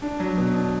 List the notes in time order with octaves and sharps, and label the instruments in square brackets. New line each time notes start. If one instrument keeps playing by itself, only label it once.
[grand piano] D4
F#3
B2
D4